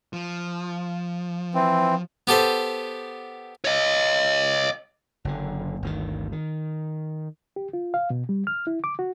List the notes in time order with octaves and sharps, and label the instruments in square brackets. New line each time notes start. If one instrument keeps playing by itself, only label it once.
[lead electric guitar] F3
[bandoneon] E3 C4
[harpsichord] B3 G4 A4 C5
[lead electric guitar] C#5 D#5
[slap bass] F#1 F#2 D3
G1 D2 B2 D#3
D#3
[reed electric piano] G4
F4
F5
B2
G3
F6
E4
D6
F#4